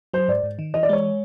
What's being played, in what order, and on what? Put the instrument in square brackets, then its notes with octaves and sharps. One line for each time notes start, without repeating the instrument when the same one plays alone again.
[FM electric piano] F#3 [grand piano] C5
[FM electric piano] G#2 [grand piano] D5
[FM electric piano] G#2
D#3
[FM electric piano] E3 [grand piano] D#5
[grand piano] D5
[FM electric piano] G#3 [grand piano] C#5